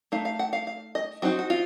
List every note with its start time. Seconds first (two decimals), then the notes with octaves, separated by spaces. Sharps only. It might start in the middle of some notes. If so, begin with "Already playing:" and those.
0.12 A3 D#4 F5
0.25 F5
0.39 F#5
0.53 F5
0.67 F5
0.95 D#5
1.22 F#3 C4 D#4 F#4
1.39 F#4
1.50 F4